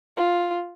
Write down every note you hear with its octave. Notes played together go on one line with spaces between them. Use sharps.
F4